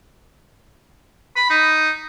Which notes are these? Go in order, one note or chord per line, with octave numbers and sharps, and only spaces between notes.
B5
D#4